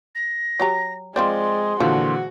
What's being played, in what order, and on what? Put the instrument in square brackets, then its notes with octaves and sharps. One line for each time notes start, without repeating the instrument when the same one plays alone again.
[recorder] A#6
[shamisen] F#3 G4 A#5
[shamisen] F3 C4 C5 [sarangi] G#3 [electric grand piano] D5 [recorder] C6
[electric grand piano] A#2 D3 E3 [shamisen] F3 [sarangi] F#4